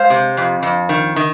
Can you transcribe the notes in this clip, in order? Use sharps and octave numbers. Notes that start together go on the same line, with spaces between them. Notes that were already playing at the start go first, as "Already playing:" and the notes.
Already playing: G#3 C5 F5
C3
F2
F2
D#3
D#3